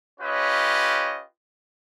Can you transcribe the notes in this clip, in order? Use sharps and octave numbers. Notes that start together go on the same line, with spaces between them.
C#4 F4 G4 B4 C#5 D#5